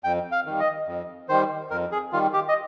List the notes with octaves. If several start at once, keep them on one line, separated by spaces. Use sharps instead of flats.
F2 G5
F5
D#3 G3
D#5
F2
D#3 G3 C5
F2 A#4
G#4
D#3 G3 F4
G4
D#5